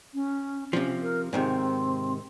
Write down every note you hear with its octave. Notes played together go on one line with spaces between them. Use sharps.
C#4
C3 F3 C#4
A#4
G#2 C3 D#3 C4